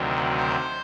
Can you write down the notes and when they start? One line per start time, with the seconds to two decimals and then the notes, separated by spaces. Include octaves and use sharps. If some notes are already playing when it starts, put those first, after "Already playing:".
Already playing: D2 C3 D#3 F#3
0.37 C5